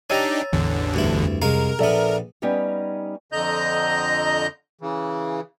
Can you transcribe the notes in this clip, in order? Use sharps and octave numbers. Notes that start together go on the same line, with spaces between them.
D4 D#4 G4 C#5 G#5 A#5 E6 A6
A1 E2 D3
D2 G2 E4
F2
C2 G#3 A#4 F5
A#1 B3 A4 D5 E5
G3 B3 C#4 D#4 G4
F2 D3 D#5 A#5 G6
C#3 E3